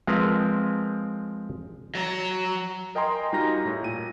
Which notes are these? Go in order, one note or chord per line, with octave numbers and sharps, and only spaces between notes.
F3 G#3 C4 A#4 B4
F#3 A#5
A#4 D#5 G5 G#5 A#5 C6
G3 D#4 F4 F#4 A#5 A#6
A2
A#2 D#7